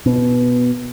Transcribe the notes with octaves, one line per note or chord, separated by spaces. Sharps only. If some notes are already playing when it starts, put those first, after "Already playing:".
B2